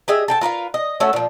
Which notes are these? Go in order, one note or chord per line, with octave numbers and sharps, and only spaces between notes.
G4 G#4 D#5 E5
A4 G5 A5
F4 A#4 B4 F5
D#5
A3 C#4 F#4 E5
A#2 F3